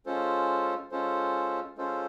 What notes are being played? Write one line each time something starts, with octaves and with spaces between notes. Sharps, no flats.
G#3 C#4 F4 A4 C5
G#3 C#4 F4 A4 C5
G#3 C#4 F4 A4 C5